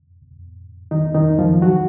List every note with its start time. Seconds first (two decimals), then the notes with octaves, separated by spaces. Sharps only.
0.91 D#3 D#4
1.14 D#3 D#4
1.39 F3 F4
1.62 F#3 F#4